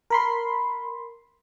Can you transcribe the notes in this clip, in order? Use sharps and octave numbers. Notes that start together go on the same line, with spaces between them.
A#4 B5 C6